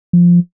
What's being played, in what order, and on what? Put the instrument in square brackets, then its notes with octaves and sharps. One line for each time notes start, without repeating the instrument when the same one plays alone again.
[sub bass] F3